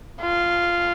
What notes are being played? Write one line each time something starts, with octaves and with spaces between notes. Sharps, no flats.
F4